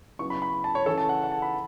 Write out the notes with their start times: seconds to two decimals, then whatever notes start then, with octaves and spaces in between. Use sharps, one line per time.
0.19 C#3 F#3 B3 E4 C#6
0.30 B5
0.42 B5
0.64 A5
0.75 C#5
0.86 C#3 E3 C#4 E4 A4
0.98 A5
1.09 F#5
1.24 F#5
1.32 A5
1.42 B5